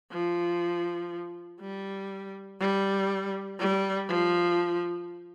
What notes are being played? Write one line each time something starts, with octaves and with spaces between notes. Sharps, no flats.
F3
G3
G3
G3
F3